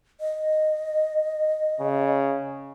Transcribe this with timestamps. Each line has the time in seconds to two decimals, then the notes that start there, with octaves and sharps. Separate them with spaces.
0.20 D#5
1.80 C#3